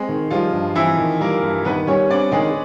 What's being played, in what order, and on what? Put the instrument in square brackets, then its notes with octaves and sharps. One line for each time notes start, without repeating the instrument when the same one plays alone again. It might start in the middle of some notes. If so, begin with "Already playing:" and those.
Already playing: [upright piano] G#3 G#4 [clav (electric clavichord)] C4
[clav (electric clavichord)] D#3
[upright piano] F3 F4 [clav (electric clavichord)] G3
[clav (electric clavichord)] G2
[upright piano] E3 E4 [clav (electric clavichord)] C4
[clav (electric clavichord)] D#3
[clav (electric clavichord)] G3 [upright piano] A#3 A#4
[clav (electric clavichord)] G2
[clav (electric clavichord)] D#3 [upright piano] B3 B4
[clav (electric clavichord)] G3 [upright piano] C#4 C#5
[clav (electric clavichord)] C4 [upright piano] D4 D5
[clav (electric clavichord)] D#3 [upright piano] G#3 G#4